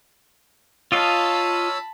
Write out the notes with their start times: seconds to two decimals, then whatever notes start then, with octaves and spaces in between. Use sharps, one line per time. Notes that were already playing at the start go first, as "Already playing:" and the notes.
0.92 F4 C#5 D#5 F5 A5 B5 E6